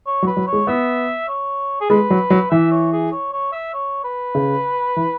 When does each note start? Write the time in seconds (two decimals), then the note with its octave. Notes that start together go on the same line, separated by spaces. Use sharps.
0.07 C#5
0.23 F#3
0.27 B4
0.37 F#3
0.47 C#5
0.53 G#3
0.67 B3 E5
1.28 C#5
1.81 G#4
1.90 G#3 B4
2.10 F#3
2.30 F#3
2.51 E3 E5
2.71 C#5
2.93 G#4
3.12 C#5
3.33 C#5
3.53 E5
3.74 C#5
4.04 B4
4.35 C#3
4.96 E3